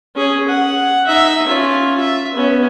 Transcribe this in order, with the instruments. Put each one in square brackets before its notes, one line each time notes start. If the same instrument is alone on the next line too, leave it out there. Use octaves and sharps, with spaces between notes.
[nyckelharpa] C#4 G#4
F#5
D#4 E5
C#4 F4
E5
B3 C#4